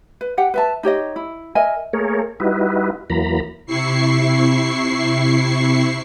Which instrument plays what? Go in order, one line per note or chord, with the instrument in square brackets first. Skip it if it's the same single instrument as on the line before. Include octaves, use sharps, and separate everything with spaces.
[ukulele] B4
G4 F#5 G5
B4 E5 A5
D#4 G4 C#5 D#5
E4
A#4 D#5 E5 G#5
[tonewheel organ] A3 A#3 G#4 A#4 C#5
G3 D#4 E4 F#4 B4
E2 E3 F#3 A#3 A#5 B5
[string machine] C3 E4 C#6 C7